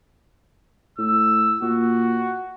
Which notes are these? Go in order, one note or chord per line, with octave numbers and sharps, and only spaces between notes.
A2 E6
A#2 F#4